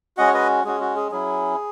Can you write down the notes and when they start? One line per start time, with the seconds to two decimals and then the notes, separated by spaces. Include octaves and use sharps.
0.17 G#3 C#4 F#4 D#5 F#5
0.27 C#5
0.34 B4 D#5
0.65 G#3 C#4 F#4 G#4
0.81 F#4
0.96 G#4
1.11 F#3 C#4 E4 G#4